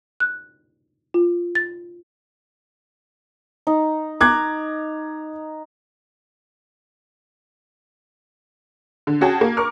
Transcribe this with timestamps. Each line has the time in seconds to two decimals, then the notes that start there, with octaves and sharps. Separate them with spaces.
0.20 F#6
1.14 F4
1.55 A6
3.67 D#4
4.21 A#5 D6 F#6 G#6
9.07 D3
9.21 C#4 F#4 G#4 G5 A5
9.41 A#3
9.57 A#4 C#6 D6 F6